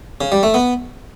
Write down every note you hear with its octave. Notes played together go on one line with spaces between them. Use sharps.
C#3
G3
A3
B3